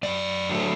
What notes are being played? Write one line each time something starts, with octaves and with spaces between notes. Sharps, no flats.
F#2 D5
D3 F#3 A3